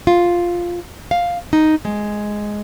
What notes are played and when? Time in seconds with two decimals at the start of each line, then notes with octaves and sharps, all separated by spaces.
0.07 F4
1.11 F5
1.53 D#4
1.85 G#3